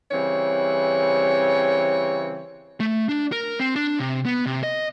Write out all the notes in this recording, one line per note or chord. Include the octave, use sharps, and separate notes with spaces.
C#3 E3 G3 C4 C#5
A3
D4
A#4
C4
D4
C3
B3
C3
D#5